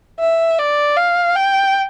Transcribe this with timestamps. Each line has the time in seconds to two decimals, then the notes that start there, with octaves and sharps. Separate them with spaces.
0.19 E5
0.58 D5
0.97 F5
1.35 G5